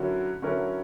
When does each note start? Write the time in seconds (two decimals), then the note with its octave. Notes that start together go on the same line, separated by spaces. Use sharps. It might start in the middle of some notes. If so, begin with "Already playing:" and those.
Already playing: D3 F#3 C#4 E4 A#4
0.42 D3 F#3 C#4 E4 A#4